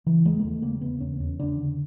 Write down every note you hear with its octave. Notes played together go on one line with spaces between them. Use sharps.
C#3 E3
E2 G#3
A#3
E2 A3
C#3 A#3
C#3 B3
E2 C#4
E2 C#4
C#3 D4
D3